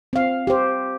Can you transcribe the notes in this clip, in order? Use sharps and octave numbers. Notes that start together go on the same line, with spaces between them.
C4 F5
G4 C5